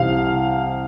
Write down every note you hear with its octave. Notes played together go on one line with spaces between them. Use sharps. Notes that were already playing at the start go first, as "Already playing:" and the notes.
Already playing: C2 C3 E3 G3 F5